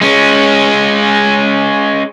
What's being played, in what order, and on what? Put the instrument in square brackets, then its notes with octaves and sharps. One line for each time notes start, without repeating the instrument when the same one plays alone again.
[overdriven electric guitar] G#3 C#4